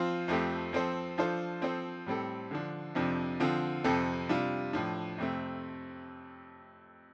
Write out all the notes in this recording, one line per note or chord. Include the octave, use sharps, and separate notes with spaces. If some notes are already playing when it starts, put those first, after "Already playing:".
Already playing: F3 C4 F4 C5
F2 F3 A3 C4 G4
F3 C4 A4 C5
F3 D4 F4 A4 C5
F3 C4 A4 C5
A2 G3 C4 A4
D3 F3 D4
F2 C3 F3 D4
D3 F3 C4 F4
F2 C3 F3 C4 A4
C3 G3 D4 F4
A2 F3 D4
F2 C3 A3 C4